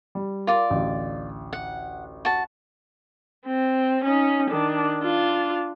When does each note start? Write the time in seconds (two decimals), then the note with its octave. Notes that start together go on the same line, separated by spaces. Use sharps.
0.15 G3
0.47 F4 A#4 D5
0.70 A1 D2
1.53 F#5
2.25 F#4 A5
3.46 C4
4.04 C#4 D#4
4.50 D#3 D4
5.00 D4 F4